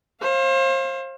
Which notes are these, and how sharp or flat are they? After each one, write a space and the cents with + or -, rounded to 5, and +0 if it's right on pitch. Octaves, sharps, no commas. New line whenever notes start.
C5 +35 F5 -5